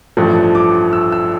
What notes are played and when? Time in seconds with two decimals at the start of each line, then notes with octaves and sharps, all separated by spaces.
0.17 A1 G2 F3 A3
0.55 D6
0.93 E6
1.12 E6